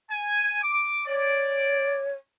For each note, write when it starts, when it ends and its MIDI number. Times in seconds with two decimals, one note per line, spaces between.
0.11 0.60 80
0.63 1.06 86
1.07 2.13 73
1.07 2.02 74